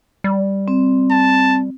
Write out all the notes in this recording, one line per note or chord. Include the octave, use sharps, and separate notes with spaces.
G3
C4
A5